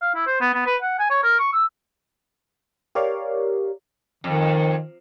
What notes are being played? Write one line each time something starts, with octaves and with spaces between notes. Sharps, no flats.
F5
E4
C5
B3
B3
B4
F#5
G#5
C#5
A#4
C#6
E6
G4 A#4 C#5 D5 F5
F2 D#3